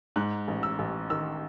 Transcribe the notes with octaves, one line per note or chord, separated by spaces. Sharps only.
G#2 F#6
A1
E6
A1
D#3 E6